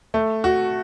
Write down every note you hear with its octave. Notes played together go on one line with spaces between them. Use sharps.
A3
F#4